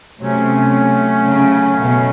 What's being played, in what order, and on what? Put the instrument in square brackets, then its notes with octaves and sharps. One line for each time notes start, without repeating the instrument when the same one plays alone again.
[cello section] C3 [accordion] F#3 A3 C#4
[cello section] C#3
B2